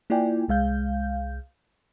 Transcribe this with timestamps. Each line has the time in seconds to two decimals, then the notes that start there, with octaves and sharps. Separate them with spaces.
0.10 A#3 E4 F4 D5 G5 G#5
0.48 C2 G#3 F5 G6